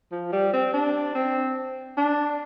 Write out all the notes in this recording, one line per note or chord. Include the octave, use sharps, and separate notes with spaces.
F3
G3
C4
D4
C4
D4